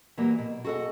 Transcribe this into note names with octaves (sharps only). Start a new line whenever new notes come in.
E3 F#3 G3 A#3
B2
F#4 G#4 A4 D#5 F#5